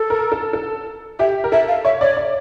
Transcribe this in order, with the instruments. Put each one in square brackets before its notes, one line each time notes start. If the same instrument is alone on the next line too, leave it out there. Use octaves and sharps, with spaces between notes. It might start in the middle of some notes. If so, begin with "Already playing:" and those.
Already playing: [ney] A4
[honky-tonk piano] A#4
A4
A4
[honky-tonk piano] G4 [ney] E5
[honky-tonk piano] A#4
[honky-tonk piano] A4 [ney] E5
[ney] F5
[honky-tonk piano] C#5 [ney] E5
[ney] C#5 [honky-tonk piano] D5
[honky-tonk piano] D5